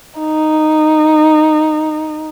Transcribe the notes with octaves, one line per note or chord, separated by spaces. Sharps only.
D#4